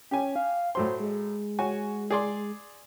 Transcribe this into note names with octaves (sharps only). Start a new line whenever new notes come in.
C#4 G4 G5 G#5
F5
A2 F#3 C5 C6
G#3
F#4 C#5 G#5
G#4 D5 C6